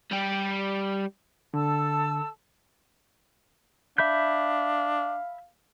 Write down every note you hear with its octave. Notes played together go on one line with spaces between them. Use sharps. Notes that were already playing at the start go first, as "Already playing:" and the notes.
G3 G4
D3 A4 A5 E6
D4 E5 F5 B5 G6